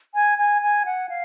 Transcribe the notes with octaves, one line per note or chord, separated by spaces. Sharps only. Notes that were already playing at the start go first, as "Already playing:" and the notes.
G#5
G#5
G#5
F#5
F5